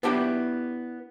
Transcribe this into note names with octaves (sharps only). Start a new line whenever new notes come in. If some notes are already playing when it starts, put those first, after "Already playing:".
B3 D4 E4 G4 E5 B5